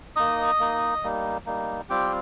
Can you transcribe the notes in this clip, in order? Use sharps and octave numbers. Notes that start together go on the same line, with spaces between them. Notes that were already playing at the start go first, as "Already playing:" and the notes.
A#3 D#4 D#5 D#6
A#3 D#4
G3 A#3 D#4
G3 A#3 D#4
G3 C4 F4 G4 G5